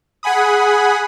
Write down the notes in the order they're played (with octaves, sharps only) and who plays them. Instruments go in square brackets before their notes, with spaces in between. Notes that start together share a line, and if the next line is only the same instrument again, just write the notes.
[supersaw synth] G#4 F#5 G#5 B5 D#6